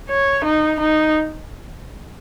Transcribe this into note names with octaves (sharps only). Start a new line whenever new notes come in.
C#5
D#4
D#4